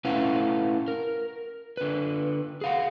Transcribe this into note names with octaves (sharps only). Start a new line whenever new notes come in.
A3 C#4 E4 B4 F5 F#5
A#4
D3 B4
G#4 F5 F#5